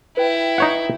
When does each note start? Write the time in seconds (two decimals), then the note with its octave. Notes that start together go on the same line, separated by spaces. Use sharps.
0.17 E4 B4 G5
0.58 D#4 C#5 F#5